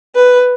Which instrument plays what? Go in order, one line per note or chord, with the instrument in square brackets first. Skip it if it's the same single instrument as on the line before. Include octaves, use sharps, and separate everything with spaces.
[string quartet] B4